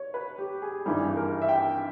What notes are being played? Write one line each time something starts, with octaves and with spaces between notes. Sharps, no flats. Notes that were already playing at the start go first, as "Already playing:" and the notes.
Already playing: C#5
B4
G4
G#4
G#1 G2 E3 G3 G#4
A#4
E5
G5